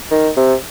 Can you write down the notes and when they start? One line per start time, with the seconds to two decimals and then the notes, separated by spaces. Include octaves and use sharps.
0.11 D#3
0.36 C3